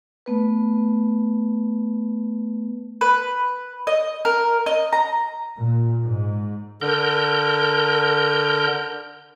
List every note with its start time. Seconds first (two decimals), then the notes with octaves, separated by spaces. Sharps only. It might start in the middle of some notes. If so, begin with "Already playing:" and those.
0.26 A3 B3 B4
3.01 B4
3.87 D#5
4.25 A#4
4.66 D#5
4.93 A#5
5.57 A#2
6.02 G#2
6.81 D3 A#4 G6